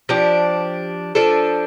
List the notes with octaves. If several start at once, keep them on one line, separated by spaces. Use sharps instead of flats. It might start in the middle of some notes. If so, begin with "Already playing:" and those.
F3 D4 G4
F3 D4 A4